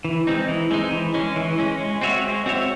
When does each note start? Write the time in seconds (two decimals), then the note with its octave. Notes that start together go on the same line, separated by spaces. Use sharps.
0.05 E3
0.27 G#3 C4 D#4
0.48 E3
0.71 G#3 C4 D#4
0.92 E3
1.14 G#3 C#4
1.36 E3
1.58 G#3 C#4
1.80 G#3
2.01 C4 F#4 C#5 E5
2.24 G#3
2.46 C4 F#4 C#5 E5